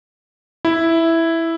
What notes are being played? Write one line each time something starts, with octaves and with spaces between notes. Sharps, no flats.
E4